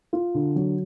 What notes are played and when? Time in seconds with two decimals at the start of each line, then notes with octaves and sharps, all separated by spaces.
0.13 F4
0.34 D3
0.56 F#3